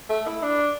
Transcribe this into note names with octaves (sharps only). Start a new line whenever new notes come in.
A3
E4
D4